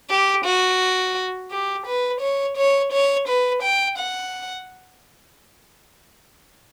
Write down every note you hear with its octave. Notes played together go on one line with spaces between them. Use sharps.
G4
F#4
G4
B4
C#5
C#5
C#5
B4
G5
F#5